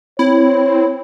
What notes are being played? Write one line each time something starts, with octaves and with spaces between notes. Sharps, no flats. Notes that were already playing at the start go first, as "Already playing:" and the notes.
C4 E4 C#5